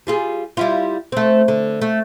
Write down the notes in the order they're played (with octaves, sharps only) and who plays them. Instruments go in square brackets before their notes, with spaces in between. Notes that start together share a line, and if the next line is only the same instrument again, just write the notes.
[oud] G3 F4 G#4
G3 E4 F4
A3 C4
D3
A3